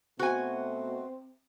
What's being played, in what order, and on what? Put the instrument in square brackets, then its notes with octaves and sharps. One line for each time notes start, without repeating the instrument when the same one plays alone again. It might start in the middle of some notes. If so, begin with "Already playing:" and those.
[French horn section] B2 A3 [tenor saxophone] C4 [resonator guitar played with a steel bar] F#4 G#5